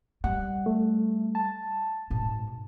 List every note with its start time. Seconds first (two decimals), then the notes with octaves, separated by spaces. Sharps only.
0.24 G3 F#5
0.66 A3
1.35 A5
2.10 G#2 B2